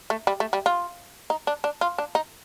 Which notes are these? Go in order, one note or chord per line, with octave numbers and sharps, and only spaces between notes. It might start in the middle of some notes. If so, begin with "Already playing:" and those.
A3
G3
A3
G3
F4
D#4
D4
D4
F4
D4
D#4